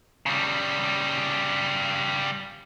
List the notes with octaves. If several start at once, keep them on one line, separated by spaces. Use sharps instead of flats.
C#3 G3